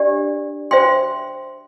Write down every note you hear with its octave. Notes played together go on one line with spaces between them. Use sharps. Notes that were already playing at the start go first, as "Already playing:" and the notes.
Already playing: D4 G4 D5
C5 E5 G5 C6